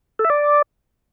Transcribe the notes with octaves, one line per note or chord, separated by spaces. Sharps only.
A4
E5
D5